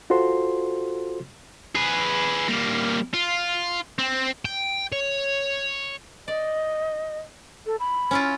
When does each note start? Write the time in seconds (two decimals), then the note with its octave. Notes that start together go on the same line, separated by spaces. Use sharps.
0.10 F4 F#4 A4 C5 C6
1.75 G#4 B4
2.48 G3 A#3
3.14 F4
3.99 C4
4.45 G5
4.92 C#5
6.28 D5 D#5
7.66 A4
7.80 B5
8.11 C#4 E4 F4